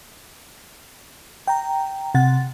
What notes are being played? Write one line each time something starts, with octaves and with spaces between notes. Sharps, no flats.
G5 A#5
C3 F#5 A6